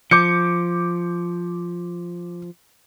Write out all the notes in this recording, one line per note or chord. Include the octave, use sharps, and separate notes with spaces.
F3 D6 G6 C#7